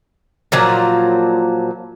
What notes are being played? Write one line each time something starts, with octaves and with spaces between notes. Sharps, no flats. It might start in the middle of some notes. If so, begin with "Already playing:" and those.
A#2 F3 F#3